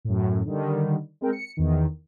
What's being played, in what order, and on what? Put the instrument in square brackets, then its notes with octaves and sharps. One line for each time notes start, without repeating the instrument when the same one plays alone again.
[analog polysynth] F#2 A2
D3 D#3 G3
G#3 C4 A#4 G5
C#7
E2 D#3